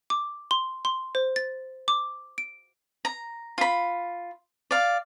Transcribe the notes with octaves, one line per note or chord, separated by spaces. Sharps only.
D6
C6
C6
C5
A6
D6
D7
A#5
F4 B5
D5 F5